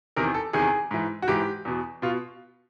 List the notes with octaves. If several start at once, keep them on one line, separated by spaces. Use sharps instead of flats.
E2 C3 D#3 A#4
A4
E2 C3 D#3 G#4
G#2 E3
F#4
G#2 E3 G4
E2 B2
B2 F4